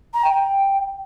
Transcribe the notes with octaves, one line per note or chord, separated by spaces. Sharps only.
A#5
G5
G5